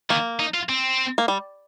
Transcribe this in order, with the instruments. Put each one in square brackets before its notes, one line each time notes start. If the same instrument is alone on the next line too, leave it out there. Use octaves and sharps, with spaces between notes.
[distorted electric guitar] D#3 [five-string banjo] A#3
[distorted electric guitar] D#4
F4
C4
[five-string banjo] A#3
G3